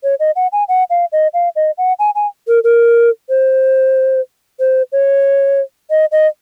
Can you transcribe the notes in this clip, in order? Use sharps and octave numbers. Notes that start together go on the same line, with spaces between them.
C#5
D#5
F#5
G#5
F#5
F5
D#5
F5
D#5
F#5
G#5
G#5
A#4
A#4
C5
C5
C#5
D#5
D#5